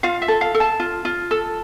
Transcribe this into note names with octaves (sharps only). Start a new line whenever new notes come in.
F4 F5
E5
A4
F5
A4
A5
F4
F4
A4